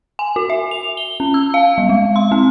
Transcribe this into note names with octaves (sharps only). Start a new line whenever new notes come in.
G#5
F#4
E5
F7
G7
C#4
E6
F5
G3
G#3
C6
C4